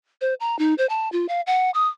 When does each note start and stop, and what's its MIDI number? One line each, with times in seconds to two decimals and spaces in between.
0.21 0.34 72
0.40 0.58 82
0.59 0.74 63
0.78 0.86 72
0.89 1.10 81
1.12 1.26 65
1.29 1.41 77
1.47 1.71 78
1.74 1.88 87